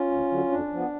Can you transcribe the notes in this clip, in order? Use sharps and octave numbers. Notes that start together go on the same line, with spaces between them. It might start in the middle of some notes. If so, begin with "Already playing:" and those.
Already playing: C#4 F4
D2
D3 F#3
F2 D4
F3 B3